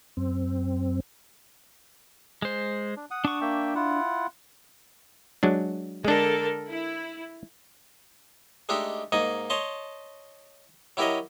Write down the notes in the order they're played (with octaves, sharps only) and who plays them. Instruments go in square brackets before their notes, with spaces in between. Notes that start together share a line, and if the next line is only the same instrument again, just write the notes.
[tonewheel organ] F#2 C4
[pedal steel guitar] G#3 C5
[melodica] D4
F#5 D#6
[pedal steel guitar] D4 C#6
[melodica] A#3 E5 G5
E4 F4 F#5
[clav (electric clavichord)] F#3 G#3 D4
[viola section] D3 A4 A#4 [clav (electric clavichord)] G#3 D4
[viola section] E4
[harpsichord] G#3 A3 D4 D#4 G4 A4
G#2 A#3 D#4 D#5 G#5
C#5 D#5 A5 C6
F#3 E4 G4 A#4 C#5 D#5